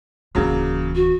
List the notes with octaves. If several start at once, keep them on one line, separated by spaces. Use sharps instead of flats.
D1 C#3 E3 F#3 A#3
F#4